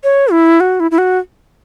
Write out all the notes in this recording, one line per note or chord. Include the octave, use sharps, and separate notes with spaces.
C#5
E4
F#4
E4
E4
F#4